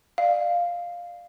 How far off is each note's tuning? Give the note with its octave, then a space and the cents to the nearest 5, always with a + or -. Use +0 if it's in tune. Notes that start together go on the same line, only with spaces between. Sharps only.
D5 +30 F5 +0